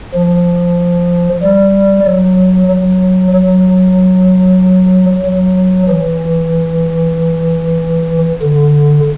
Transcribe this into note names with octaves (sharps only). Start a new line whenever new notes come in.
F3
G3
F#3
F#3
F#3
F#3
E3
D3